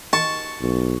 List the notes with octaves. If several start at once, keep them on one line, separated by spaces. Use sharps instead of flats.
A5 C#6
B1